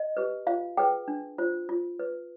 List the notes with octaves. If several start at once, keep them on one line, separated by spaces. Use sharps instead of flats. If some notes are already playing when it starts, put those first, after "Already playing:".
Already playing: D#5
G4 B4
F4 F5
G#4 B4 G5
D4
F4 C5
F4
B4